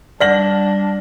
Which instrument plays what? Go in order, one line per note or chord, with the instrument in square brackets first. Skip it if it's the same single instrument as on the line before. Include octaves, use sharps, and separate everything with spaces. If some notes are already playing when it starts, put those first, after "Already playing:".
[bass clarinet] G3 [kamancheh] D4 [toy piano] D5 F#5 [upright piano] F6 A#6 F#7